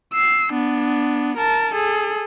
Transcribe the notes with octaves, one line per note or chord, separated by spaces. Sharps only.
E6 C7
B3 D4
A#4 A5
G#4 A4